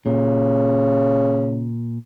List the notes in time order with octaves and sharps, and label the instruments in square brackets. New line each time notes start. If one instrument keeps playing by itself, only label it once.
[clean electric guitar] A#2 [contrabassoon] C#3